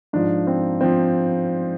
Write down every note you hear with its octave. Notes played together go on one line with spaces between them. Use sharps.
G#2 F3 D4
C4
F3 C4